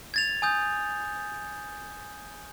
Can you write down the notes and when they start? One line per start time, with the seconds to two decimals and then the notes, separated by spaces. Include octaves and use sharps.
0.14 G#6 A6 F7
0.42 G#5 D#6 G6